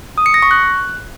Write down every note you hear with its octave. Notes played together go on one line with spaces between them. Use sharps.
D#6
C#7
A#6
C#6
F#6